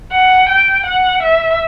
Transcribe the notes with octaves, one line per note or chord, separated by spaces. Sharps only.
F#5
G5
F#5
E5